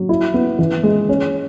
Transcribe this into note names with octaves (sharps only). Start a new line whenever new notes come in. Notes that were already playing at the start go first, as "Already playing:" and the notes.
Already playing: F#3
E4
B3
E3
G#3
C#4